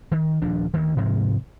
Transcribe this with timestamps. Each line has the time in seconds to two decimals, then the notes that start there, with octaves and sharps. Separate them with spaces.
0.12 D#3
0.42 D#1 F3 D4
0.74 D2 D#3
0.97 G#2 C3 F3 G#3